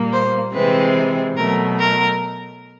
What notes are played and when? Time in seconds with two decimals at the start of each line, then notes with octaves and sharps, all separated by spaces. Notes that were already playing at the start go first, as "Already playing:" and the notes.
Already playing: A#2 G3 A#3
0.12 C5
0.53 C3 E3 G#3 C4 B4
1.36 B2 F#3 A3 A#4
1.77 A#4